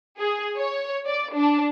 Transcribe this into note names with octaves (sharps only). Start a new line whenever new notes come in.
G#4
C#5
D5
D4